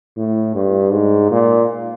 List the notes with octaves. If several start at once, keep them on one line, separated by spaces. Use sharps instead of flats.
A2
G2
G#2
A#2